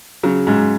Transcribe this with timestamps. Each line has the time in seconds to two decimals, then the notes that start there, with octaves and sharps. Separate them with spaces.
0.23 C#3 F#3
0.47 G#2 C#3